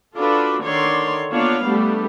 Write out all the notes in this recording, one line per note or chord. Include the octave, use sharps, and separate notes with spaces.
D4 F4 F#4 A4 B4
D3 D#3 C#5 D5 C6
A#3 B3 D4 F4 C#5 F5
G3 A3 B3 D4 G4